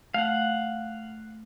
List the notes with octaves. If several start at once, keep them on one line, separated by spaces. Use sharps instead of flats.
A3 F5 F#5